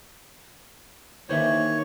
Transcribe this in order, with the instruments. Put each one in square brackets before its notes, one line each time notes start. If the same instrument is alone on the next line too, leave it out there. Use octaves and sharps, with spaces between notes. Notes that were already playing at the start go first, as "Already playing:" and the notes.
[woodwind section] D#2 E3 A#3 [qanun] D#3 D4 [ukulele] C5 E5 [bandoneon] C#5